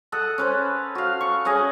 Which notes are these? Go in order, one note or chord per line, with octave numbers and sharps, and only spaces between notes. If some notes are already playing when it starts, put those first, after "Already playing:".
A4 D#5 F#5
C#4 B4 C5
F#4 F5
C#6
C#4 G#4 D#5 G#5